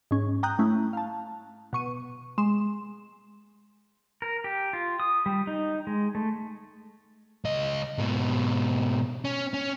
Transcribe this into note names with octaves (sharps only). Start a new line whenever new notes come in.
G#2 C#4
G5 A#5 D#6 F#6 G6
A3 C#4 E4
F5 A5
B2 C#6 D#7
G#3 C6 E7
A#4
G4
F4
D#6
G3
D#4
G#3
A3
C#2 D#5
G#2 B2
C#4
C#4